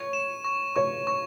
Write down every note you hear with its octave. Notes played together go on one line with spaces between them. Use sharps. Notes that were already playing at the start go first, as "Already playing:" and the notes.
Already playing: C#5 C#6
E7
C#6
C#5 C#6
C#6